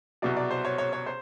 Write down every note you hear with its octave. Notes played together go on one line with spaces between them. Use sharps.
C2 B2 F#3 D5
D5
C5
C#5
C#5
C#5
C5